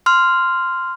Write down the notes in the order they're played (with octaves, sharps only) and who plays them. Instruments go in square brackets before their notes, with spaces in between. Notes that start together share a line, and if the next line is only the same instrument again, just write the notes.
[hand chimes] C6 F6